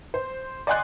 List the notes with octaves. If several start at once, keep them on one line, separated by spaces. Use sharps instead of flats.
C5
D5 D#5 F#5 G#5 C6 F#6